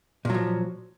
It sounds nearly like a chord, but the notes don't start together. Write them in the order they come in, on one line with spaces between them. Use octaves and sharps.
A#2 F#3 F3